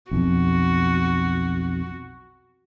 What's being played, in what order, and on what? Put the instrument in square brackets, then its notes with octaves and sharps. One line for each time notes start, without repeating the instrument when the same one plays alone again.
[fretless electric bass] B1 F2 [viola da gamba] F#4